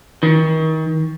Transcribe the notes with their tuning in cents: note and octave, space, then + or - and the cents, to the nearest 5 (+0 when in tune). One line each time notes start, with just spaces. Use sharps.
D#3 +35